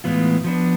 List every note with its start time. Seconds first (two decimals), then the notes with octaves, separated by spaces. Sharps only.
0.04 A2 E3 G#3 B3 F4
0.44 F3 B3 D4